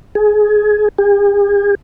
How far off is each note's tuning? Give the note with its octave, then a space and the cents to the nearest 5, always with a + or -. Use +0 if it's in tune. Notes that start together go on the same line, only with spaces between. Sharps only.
G#4 +20
G#4 -45